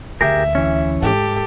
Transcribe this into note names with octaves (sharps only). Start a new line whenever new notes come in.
D2 G4 G#4 A#4 E5
E3 C#4
G#2 G4 A4